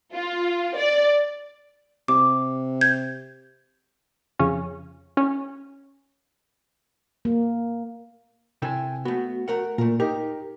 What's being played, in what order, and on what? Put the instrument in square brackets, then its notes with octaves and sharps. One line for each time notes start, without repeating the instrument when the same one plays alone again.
[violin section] F4
D5
[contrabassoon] C3 [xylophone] D6
[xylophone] G6 G#6
[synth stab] F2 C#3 C#4
C#4
[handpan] A#3
[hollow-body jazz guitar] C3 E4 A4 [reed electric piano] G5 G#5
[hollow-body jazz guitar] A3 B3 [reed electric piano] F#4
[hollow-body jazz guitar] A3 A#4 F#5
[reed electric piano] A#2 [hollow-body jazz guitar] A3 A#4
[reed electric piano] D#4 G4 [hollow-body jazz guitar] A#4